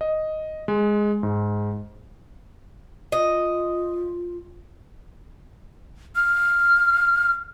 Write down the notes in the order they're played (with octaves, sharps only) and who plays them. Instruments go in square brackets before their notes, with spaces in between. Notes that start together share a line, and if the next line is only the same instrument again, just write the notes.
[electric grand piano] D#5
G#3
G#2
[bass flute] F4 [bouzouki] D#5
[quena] F6